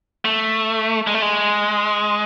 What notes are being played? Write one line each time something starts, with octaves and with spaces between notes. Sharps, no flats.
A3
G#3
A3
G#3